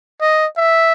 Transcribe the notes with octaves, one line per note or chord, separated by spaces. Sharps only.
D#5
E5